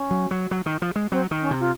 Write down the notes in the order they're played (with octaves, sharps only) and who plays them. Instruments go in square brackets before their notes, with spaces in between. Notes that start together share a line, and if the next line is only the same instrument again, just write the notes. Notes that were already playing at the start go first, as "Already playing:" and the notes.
Already playing: [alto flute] C#4
[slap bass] F#3
F#3
F#3
D#3
F3
G#3
[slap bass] F#3 [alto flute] C4
[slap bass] D#3
[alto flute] C#4
[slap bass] C3
[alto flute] F4